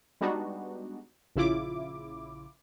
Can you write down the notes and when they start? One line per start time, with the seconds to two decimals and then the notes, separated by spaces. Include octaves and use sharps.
0.21 G3 G#3 B3 D4 D#4 F#4
1.35 A#1 C#3 E4 F4 D6